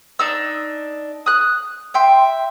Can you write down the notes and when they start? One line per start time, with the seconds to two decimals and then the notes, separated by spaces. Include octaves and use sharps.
0.19 D4 D#4 E6
1.26 D#6 F#6
1.94 E5 G5 C6